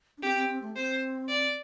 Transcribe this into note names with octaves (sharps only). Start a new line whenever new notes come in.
D4
C4 G4
C4
C4
A3
C4 C5
D5